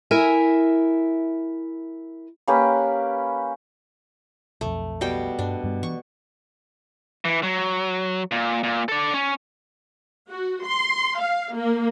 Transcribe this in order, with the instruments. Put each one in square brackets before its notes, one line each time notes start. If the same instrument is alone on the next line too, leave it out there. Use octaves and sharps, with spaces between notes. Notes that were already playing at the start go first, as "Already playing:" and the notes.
[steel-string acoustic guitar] E4 A#4 E5 G#5
[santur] A#3 C#4 G4 B4
[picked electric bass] B1 F2 [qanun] A3
[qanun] B2 G3 G5
[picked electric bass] G2 [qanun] D4
[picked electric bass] G2 G3 B3
[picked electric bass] E3 B3 [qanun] C#6
[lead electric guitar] E3
F#3
A#2
A#2
A4 D5
C#4
[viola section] F#4
C6
F5
A#3